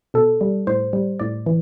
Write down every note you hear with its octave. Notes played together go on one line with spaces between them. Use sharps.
B2 A4
G3
A2 C5
G3
A2 D5
E3